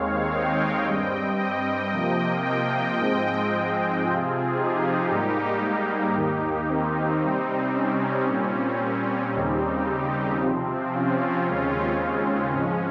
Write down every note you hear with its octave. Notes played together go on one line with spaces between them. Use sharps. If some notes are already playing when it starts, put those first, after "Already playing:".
Already playing: D#2 D#3 G#3 C4 C#5 F5
D#5 G5
G2 G3 C4
D#5 G5
C3 F3 A#3
D#5 G5
G#2 F3 G#3 C4
C3 F3 C4 F4 G#4
D#4 G4
G#2 G3 A#3
D#2 D#3 A#3
C4 D#4
C3 G3 C4
C#4
A#2 G3 C4 C#4
D#2 C#3 G3 C4 D#4 G4
C3 F3 C4
C#4 F4
D#2 C#3 G#3 C4
C#4
G#2 F3 G#3